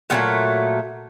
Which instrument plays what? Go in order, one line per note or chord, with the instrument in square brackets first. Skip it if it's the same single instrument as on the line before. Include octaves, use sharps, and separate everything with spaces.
[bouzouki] A#2 F#3 A3 B3